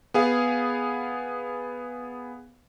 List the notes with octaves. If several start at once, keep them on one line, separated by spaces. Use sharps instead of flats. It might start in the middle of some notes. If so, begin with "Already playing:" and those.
B3 G#4 F5